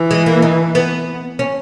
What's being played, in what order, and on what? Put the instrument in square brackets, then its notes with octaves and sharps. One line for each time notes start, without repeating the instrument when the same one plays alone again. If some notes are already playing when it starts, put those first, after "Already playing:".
Already playing: [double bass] E3
[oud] G#3
A#3
D#4
B3
C#4